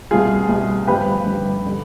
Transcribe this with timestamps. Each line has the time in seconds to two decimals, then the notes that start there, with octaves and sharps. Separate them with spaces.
0.11 C2 B2 G3 F4 G#4
0.49 C2 B2 G3
0.87 G1 G2 F3 G4 B4
1.25 G1 G2 F3
1.66 D3 G3